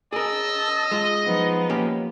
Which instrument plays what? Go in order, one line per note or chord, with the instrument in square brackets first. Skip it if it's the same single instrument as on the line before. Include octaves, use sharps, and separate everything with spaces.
[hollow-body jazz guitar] G#4 A#4 [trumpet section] D#5 [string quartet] A5 E6
[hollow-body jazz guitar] G#3 F4
[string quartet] F3 B3 D#4
[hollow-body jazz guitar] A#3 C#4 G4